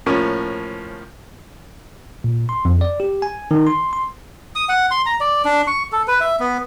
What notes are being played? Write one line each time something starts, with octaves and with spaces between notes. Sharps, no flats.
A2 F3 A#3 C#4
A#2
C6
F2
D5
G4
G#5
D#3
C6
C6
D#6
F#5
C6
A#5
D5
D4
C#6
A4
B4
E5
B3